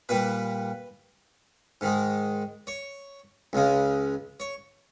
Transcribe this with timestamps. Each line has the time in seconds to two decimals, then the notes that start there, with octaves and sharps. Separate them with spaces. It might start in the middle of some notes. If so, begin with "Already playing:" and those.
0.09 A#2 G3 B4
1.81 G#2 D#3 G#3
2.67 C#5
3.53 C#2 C#3 G#3
4.40 C#5